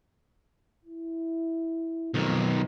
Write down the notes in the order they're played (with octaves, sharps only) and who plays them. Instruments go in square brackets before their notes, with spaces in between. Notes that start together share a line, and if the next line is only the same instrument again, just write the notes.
[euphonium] E4
[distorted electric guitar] B1 D#3 [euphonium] F2